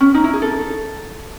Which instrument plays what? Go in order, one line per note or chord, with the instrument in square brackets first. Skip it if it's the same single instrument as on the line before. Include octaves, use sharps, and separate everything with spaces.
[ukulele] C#4
D#4
E4
G#4
A4